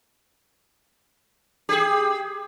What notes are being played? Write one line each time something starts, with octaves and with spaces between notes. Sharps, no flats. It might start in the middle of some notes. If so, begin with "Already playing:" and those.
G4 G#4